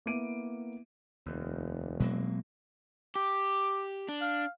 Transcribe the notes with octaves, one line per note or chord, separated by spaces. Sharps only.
A#3 B3 E4 D6 D7 D#7
F1 D#2
B2 F#3 G#3 A#3 C4
G4 D6
D4
F5